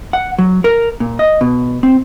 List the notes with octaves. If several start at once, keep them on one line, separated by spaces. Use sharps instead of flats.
F#5
F#3
A#4
A#2
D#5
B2
C4